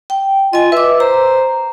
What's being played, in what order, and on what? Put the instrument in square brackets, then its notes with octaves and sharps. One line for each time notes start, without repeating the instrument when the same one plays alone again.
[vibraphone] G5
[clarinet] F4 [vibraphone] D#5 G#5
[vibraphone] B4 D6 [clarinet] E5
[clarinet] C5 [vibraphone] A#5